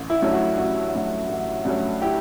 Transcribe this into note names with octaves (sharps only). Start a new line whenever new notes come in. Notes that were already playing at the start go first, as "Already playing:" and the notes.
Already playing: A1
E4
G2 F#3 A3 C#4
F#4
A1 F#4
G2 F#3 A3 C#4
A1
G2 F#3 A3 C#4
E4 G4